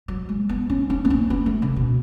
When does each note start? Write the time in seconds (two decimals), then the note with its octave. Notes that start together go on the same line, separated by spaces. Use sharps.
0.08 F#3
0.29 G#3
0.49 B3
0.70 C#4
0.90 C#4
1.05 B3
1.10 C#4
1.30 B3
1.46 A3
1.62 C#3
1.76 B2